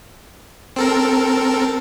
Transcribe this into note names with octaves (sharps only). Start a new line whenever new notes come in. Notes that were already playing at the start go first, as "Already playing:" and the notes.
C4 A4 A#4